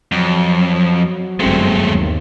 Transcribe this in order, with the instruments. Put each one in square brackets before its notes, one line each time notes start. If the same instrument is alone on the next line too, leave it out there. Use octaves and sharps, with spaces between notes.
[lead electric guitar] F2 [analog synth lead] F#3
[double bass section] G1 F#2 C4 [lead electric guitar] G#3 A3
[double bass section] D#2